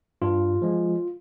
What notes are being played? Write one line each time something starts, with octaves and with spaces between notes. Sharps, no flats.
G2 F4
F3 G#3